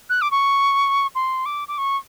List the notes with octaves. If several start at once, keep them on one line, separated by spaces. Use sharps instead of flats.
F#6
D6
C#6
C6
D6
D6
C#6